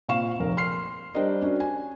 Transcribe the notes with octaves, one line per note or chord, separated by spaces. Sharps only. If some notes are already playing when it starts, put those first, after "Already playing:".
A#2 C4 F5 C#6 E7
F1 A#4
C6 F6 C7
G3 D4 G4 A#4 C5 D#5
C#4 D4 F#4
G#5